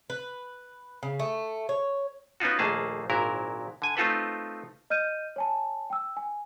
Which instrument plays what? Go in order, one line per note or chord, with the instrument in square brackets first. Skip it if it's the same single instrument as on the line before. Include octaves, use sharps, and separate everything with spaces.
[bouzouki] B4
C#3
A3
C#5
[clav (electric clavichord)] B3 C#4 D#4 F4 F#4
A#1 D#2 A3 A#3 G#4 A5
G#1 A#2 F#3 E4 A#4
D3 G#5
A3 C4 D#4 F4 A4 B4
[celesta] D#5 F6 G6 D#7
C#5 G#5 A5
G5 E6
G#5